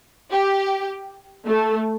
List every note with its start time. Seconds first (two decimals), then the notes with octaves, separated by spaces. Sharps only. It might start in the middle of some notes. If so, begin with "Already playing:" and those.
0.31 G4
1.46 A3